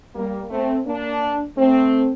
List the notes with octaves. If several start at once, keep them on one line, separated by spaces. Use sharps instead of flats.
G3 A#3
A3 C4
A#3 D4
A3 C4